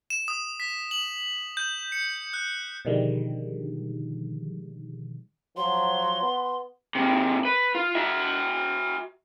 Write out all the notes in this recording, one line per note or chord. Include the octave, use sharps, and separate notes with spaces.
E7
D#6
B6
F#7
G6
C#7
F#6
B2 D3 D#3 F3 G3 G#3
F3 F#3 C6
B3
G#2 C3
B4
F4
F#4 E5